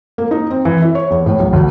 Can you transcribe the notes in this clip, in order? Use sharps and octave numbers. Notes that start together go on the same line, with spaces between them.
A#3
D#4
C4
E3
E4
C#5
E2
A2
B1
D2